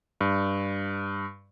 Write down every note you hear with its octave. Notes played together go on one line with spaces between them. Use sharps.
G2